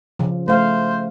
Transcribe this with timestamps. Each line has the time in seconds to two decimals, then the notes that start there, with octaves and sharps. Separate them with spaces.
0.19 C#3 F3
0.48 A3 C5 F5